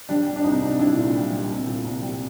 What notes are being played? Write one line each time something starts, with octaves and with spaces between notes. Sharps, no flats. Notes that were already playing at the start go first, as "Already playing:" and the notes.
G3 D4
G3
D4
C2 D#4
C2
G3 D4 E4
A#2
G3
G3
C2
A#2
C2
G3